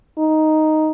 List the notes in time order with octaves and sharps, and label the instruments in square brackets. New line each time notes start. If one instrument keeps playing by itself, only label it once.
[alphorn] D#4